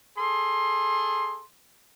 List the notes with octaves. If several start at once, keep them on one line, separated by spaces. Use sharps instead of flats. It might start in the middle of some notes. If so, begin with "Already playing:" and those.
G#4 A4 C6